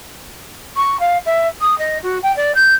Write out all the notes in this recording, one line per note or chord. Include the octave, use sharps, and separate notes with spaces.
C#6
F5
E5
D#6
D#5
F#4
G5
D5
G6